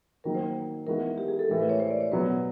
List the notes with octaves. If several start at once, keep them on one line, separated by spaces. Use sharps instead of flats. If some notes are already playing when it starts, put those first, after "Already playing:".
D#3 F#3 A#3 D#4 A#4
C5
E3 G#3 B3 D#4 F#4 A#4
G4
G#4
A4
A2 E3 G#3 A#4
B4
C#5
C5
D5
C#5
B2 F#3 B3 B4